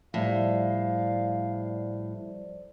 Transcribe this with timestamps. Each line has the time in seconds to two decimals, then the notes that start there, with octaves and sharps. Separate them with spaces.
0.14 A2 F3 G3 C5 D5 F5